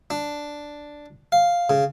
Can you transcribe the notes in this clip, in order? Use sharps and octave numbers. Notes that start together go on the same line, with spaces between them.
D4
F5
C#3